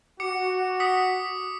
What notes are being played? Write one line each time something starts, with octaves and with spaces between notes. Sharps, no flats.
F#4 D6 C#7
D#6 B6 C#7